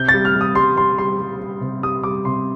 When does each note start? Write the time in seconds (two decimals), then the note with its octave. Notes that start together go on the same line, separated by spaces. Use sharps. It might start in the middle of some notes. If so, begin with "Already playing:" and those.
Already playing: C3 G6
0.09 A6
0.14 G3
0.25 F6
0.35 G3
0.41 D#6
0.55 G3 C6
0.77 G3 C6
0.98 G3 C6
1.19 G3
1.40 G3
1.61 C3
1.83 G3 D#6
2.03 G3 D6
2.25 C3 C6